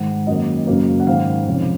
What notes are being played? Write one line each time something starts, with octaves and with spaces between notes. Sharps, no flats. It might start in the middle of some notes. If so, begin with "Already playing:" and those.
Already playing: G#2 D#3 G#3 D#4 F#5
F#2 D#3 A#3 D#5
F#1 F#2 C#3 F#3 A#3
F#5
G#2 D#3 G#3 F5
F1 F2 C#3